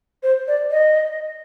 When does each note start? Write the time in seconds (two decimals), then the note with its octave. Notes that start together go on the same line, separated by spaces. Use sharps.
0.23 C5
0.48 D5
0.71 D#5